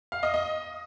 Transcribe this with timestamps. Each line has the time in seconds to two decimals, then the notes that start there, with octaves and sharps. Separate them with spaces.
0.12 F5
0.23 D#5
0.34 D#5